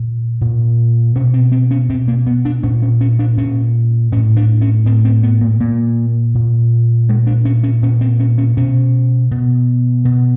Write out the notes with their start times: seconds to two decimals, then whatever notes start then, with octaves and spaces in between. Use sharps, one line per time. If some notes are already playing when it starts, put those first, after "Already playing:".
Already playing: A#2
0.41 A#2
1.16 B2 C#4
1.34 C4
1.52 C4
1.71 C#4
1.89 B2 C4
2.08 A#3
2.27 B3
2.45 D4
2.63 A#2 C#4
2.82 C#4
3.01 C#4
3.19 D4
3.38 A#2 C#4
4.12 A2 C#4
4.37 D4
4.61 C#4
4.85 A2 C4
5.05 C4
5.23 B3
5.41 A#3
5.60 A#2 A#3
6.35 A#2
7.09 A#2 G#3
7.27 D4
7.45 C#4
7.63 C#4
7.82 A#2 C#4
8.01 C4
8.20 C#4
8.38 C#4
8.57 B2 C#4
9.31 B2
10.05 B2